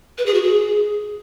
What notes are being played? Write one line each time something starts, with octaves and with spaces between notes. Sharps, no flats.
B4
G#4
F#4
G#4